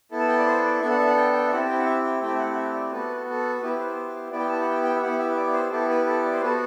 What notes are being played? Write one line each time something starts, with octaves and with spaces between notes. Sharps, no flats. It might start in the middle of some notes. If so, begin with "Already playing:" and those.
B3 E4 A4
A5
G5
D5
C5
D5
B3 D4 A4 E5
F#5
E5
F#5
G5
G5
E5
C4 E4 G4 F#5
A5
G5
F#5
E5
G5
A3 C4 E4 G4 G5
E5
F#5
F#5
E5
D5
B3 F#4 A4 B4
B4
A4
A4
B3 E4 G4 B4
C5
B3 E4 G4 D5
G5
A5
F#5
G5
G5
E5
B3 E4 G4 F#5
E5
E5
D5
D5
C5
B3 E4 G4 A4
B4
A4
D5
C5
B3 F#4 A4 B4